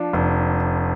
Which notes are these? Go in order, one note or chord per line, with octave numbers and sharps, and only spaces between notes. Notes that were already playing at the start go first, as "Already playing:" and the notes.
Already playing: F3 D4
F1